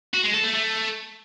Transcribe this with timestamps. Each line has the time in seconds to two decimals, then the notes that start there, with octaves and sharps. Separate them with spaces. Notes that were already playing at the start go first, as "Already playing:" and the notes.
0.14 F#4
0.24 G#3
0.34 A4
0.44 A3
0.54 A3